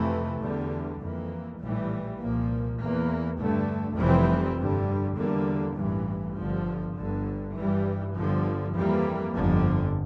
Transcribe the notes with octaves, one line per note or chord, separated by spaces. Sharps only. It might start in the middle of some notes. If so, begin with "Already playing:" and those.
Already playing: F2 C3 E3 A3
E2 D3 G3
F2 E3 A#3
A#1 A2 E3 G3
C2 A#2 F3 A#3
E2 E3 A#3
G2 D3 A3
F1 F2 E3 G3 C4
G2 D3 G3
E2 D3 G3 A#3
A1 G2 E3
G1 G2 D3 F3
G1 G2 D3
G2 E3 G3
G1 G2 D3 F3
F2 E3 G3 A#3
G1 F2 D3 F3